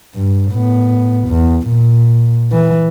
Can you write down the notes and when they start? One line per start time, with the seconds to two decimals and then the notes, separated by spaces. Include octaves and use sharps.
0.15 G2
0.51 A2 B3
1.27 E2
1.67 A#2
2.52 E3